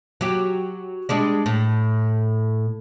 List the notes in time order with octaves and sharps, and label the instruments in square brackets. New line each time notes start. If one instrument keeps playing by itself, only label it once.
[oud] F#3 G4
G3 G#3 D4
A2